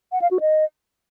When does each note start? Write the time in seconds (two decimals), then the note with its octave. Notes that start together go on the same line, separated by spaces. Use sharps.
0.12 F#5
0.21 F5
0.31 F#4
0.40 D#5